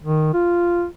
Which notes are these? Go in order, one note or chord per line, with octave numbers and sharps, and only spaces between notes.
D#3
F4